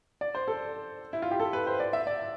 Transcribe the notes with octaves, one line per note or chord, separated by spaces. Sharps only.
D5
C5
A4
E4
F4
G4
A4
B4
C5
D5
E5
D5